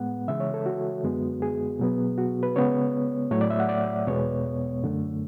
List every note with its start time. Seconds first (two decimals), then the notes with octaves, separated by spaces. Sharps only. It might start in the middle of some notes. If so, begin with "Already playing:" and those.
Already playing: A2 G#3 B3 F#5
0.28 C#3 E3 G#3 E5
0.40 C#5
0.54 A4
0.66 F#4
1.04 F#2 D3 G#3 B3
1.42 G#4
1.79 B2 F#3 B3
2.18 F#4
2.43 B4
2.56 C#3 G#3 B3 C#5
3.31 A2 F#3 A3 C#5
3.41 D5
3.50 E5
3.60 F#5
3.69 D5
4.07 E2 B2 G#3 B3 C#5
4.83 F#2 D3 A3